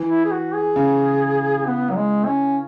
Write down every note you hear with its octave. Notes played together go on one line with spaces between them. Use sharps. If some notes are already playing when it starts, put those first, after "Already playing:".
Already playing: E3
E4
G#4
F#4
G#4
C#3
B3
F#3
G#3
C#4